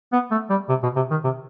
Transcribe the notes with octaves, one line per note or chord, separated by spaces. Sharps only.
B3
A3
G3
C3
B2
C3
D#3
C3